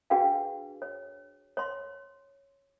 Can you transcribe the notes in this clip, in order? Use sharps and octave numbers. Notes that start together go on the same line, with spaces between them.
D4 F#4 G#4 B4 F5 G5
C#5
C#5 C6